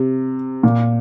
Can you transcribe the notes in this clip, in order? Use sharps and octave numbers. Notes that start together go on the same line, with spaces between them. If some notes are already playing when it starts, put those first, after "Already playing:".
Already playing: C3
A#2